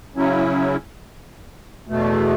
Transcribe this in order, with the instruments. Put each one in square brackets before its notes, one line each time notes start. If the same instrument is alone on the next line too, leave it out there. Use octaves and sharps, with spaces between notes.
[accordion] C#3 F#3 C#4 E4
E2 B2 A3